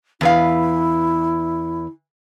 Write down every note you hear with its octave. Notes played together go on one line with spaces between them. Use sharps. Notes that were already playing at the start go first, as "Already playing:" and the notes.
E2 E4 B4 F5